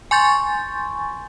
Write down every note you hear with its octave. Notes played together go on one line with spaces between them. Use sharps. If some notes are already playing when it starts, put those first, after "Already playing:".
G#5 C6 C#6 G6 A6